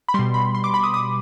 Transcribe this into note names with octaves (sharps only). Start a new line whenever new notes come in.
B5
B2 G3 C6
B5
C6
D6
B5
D#6
D#6